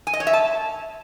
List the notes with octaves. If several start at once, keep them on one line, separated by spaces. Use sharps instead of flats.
G#5
D#5
C#5
E5
A5